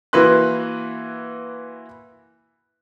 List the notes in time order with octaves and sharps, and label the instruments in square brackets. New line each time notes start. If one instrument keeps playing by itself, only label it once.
[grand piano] E3 A#3 F#4 B4 C6 F#6